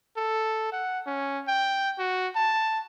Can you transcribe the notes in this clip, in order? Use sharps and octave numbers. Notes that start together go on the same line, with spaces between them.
A4
F#5
C#4
G5
F#4
A5